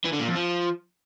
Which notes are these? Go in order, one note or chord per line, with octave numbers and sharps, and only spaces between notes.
E3
D3
A#2
F2
F3